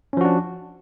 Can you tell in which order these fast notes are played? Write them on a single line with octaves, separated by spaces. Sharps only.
C#4 F3 F#4 D4